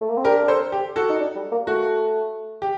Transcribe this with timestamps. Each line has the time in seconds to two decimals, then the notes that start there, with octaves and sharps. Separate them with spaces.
0.01 A3
0.09 A#3
0.17 C4
0.24 D4 G4 A#4
0.48 A4 C5
0.72 G4
0.96 F#4 A4
1.09 D#4
1.20 D4
1.35 G3
1.52 A#3
1.67 A3 F#4
2.62 G4